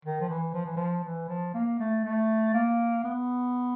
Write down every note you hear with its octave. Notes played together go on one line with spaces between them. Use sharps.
D#3
F3
E3
F3
E3
F3
E3
F3
A#3
A3
A3
A#3
B3